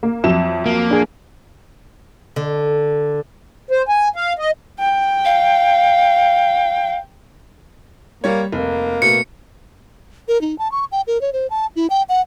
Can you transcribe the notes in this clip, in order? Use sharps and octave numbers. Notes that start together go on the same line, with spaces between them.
A#3
F2 F#3 E5 E7
A#3
D4 G#4 G#5
D3
C5
G#5
F5
D#5
G5
F5
G3 A#3 C#5
F1 A#3
B2 A3 C#7
A#4
D#4
A5
C#6
G5
A#4
C#5
C5
A5
E4
G5
F#5